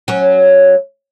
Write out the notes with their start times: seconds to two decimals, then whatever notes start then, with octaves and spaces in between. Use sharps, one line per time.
0.08 F#3 C#4